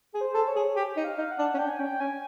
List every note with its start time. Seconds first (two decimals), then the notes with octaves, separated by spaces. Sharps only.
0.14 G#4
0.21 C5
0.34 A4
0.48 C#5
0.55 G#4
0.76 G4
0.97 D#4
1.04 F5
1.18 D#4
1.31 F#5
1.38 D4
1.54 C#4
1.58 D4 G5
1.69 G#5
1.79 C#4 G5
2.00 C#4 G#5